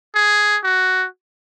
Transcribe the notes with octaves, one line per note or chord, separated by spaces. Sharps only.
G#4
F#4